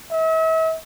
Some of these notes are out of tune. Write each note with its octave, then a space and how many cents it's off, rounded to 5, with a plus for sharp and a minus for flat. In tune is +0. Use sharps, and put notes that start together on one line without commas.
E5 -40